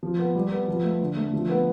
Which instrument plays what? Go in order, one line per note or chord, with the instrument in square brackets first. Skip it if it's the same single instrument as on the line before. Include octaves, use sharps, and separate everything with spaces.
[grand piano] F3
B3
G3
B3
F3
A3
D3
A3
F3
B3